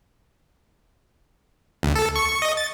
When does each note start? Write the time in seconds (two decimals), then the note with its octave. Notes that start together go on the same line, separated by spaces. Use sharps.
1.83 D2
1.96 A4
2.16 C#6
2.42 D#5
2.57 A6